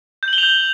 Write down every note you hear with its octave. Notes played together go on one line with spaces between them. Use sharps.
G6
F#7
G7
F7
G6